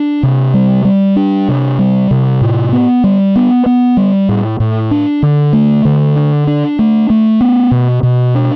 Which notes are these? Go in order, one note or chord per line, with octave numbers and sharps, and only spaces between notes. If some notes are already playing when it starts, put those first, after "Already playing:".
Already playing: D4
C3
G3
G3
D4
C3
G3
C3
A2
B3
G3
B3
B3
G3
A2
A2
D4
D3
A3
D3
D4
D4
A3
A3
B3
B2
B2
D4